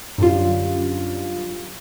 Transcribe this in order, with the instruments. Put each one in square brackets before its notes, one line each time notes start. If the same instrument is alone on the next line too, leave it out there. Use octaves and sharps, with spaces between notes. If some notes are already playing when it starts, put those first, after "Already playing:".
[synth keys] F#2 D3 G3 F4